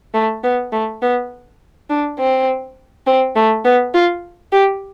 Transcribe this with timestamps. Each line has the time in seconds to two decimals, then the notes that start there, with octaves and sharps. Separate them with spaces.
0.14 A3
0.44 B3
0.73 A3
1.02 B3
1.90 D4
2.19 C4
3.07 C4
3.36 A3
3.65 B3
3.94 F4
4.52 G4